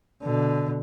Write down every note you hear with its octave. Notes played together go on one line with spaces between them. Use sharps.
B2 D3